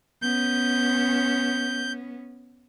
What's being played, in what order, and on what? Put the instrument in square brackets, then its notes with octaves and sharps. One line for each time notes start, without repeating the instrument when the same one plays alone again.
[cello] B3 C#4 [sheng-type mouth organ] G6